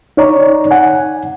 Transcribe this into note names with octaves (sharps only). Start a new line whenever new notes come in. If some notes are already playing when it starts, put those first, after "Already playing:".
D#4 C#5 D5 A#5
F#5 G#5